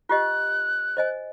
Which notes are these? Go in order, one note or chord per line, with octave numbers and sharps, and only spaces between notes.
F4 G4 D#5 F#6
C5 D#5 G#5